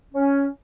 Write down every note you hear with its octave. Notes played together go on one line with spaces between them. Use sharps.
C#4